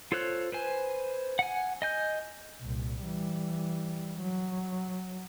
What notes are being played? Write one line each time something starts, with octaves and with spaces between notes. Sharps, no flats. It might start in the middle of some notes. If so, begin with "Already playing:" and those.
F4 A4 C5 C#5 F#6
B4 C5 G#5
F#5 G#5
D#5 G#5 G6
C2 A#2
E3 G3
F#3